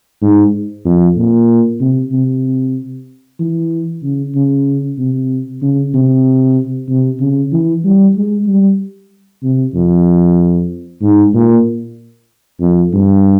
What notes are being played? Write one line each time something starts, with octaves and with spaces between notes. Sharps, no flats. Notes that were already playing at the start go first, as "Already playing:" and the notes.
G#2
F2
A#2
C3
C3
E3
C#3
C#3
C3
C#3
C3
C3
C#3
E3
G3
G#3
G3
C3
F2
G#2
A#2
F2
G2